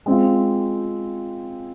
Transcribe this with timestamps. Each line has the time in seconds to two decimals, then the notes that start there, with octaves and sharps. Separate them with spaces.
0.06 G#3 C4 F4